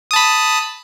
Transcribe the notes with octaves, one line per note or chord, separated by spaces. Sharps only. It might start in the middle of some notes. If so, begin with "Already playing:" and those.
A5 B5 D#6